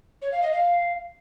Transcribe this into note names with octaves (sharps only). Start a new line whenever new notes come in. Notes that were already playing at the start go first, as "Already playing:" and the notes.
C#5
F5
D#5
F5